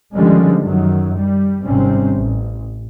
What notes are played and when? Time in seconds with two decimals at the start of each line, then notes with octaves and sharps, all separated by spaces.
0.14 D3 D#3 F3 G3 G#3 C#4
0.63 F#2 D#3 F#3
1.16 G3
1.63 G#1 C3 G3 C4 C#4
2.14 A1